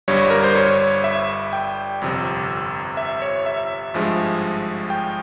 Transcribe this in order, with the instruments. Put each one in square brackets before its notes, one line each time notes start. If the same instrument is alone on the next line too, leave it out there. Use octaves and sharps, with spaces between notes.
[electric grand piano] G1 G2 G3 C#5
A#4
C5
C#5
E5
G5
G1 F2 C3
E5
C#5
E5
G#1 G2 F3 G#3
G5